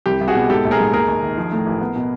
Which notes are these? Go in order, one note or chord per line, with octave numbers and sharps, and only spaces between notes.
C2 G4
C2
F#4 G#4
B2
G#2 G4 A4
A#1
G#4 A#4
G#2
D#2 G#4 A#4
D#2
D#3
F3
A2
A1
B3
B2